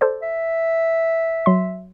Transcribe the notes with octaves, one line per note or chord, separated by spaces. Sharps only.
A4 C5 D5
E5
F#3 C6